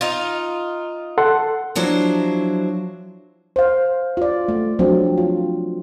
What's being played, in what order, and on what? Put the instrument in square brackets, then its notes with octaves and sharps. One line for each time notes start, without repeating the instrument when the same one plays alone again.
[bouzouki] D#4 F4
[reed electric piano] A4 F#5 C6
[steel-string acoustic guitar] F3 F#3 D4 E4 C5
[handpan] C5 F5
F4 D5
A3
F3 F#3 C4 D4
F4